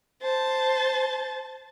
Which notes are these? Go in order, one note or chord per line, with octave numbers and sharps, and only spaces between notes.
C5 A5